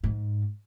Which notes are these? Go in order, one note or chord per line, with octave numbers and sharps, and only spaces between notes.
G#2